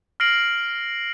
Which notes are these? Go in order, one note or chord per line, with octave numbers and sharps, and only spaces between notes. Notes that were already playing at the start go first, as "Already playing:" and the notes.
F6 A#6 C7 D7 F#7